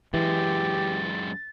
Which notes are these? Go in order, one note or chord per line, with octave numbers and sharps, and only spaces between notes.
F#2 E3 G#3 G4 A6